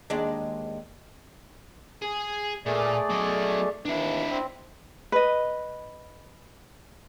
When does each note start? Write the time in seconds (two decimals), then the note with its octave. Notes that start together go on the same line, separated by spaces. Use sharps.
0.10 D#2 G#3 D4
2.02 G#4
2.66 A#2 A3 G#4 D5
3.10 F#3 D#5
3.85 D#2 E3 D4 E4
4.30 C4
5.12 B4 D#5